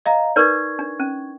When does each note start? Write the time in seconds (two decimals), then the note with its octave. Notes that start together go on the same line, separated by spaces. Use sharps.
0.06 D#5 F5 A#5
0.36 D#4 A#4 B4 D5 C#6 G#6
0.79 D4
1.00 C#4